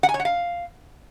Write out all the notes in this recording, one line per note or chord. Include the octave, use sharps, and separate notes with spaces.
F#5
G#5
C#5
F#5
F5